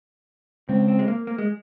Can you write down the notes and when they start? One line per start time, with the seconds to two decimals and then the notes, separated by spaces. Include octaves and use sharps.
0.69 C#3 G#3 C4 C#4
0.88 C4
0.99 G#3
1.08 A#3
1.27 A#3
1.38 G#3